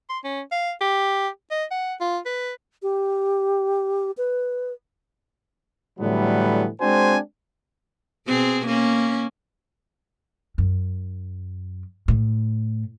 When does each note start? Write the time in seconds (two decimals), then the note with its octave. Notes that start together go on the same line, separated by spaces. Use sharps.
0.09 C6
0.24 C#4
0.52 F5
0.81 G4
1.51 D#5
1.71 F#5
2.01 F4
2.26 B4
2.83 G4
4.18 B4
5.99 A2 D3 E3 F#3 G3 B3
6.81 G#3 C4 D4 F#4 C5 G#5
8.27 B2 C4 G#4
8.66 A#3 C#4
10.58 F#2
12.08 A2